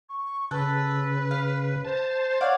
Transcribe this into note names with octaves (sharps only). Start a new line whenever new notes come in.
C#6
C#3 A4 B4 F#6
F5
C5 A5
C#5 D5 F5 F#5